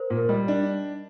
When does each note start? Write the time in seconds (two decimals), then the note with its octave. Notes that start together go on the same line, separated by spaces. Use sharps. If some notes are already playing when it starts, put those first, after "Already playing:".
Already playing: A#4 C5
0.10 A#2
0.17 A#4
0.29 G3 D#5
0.48 D4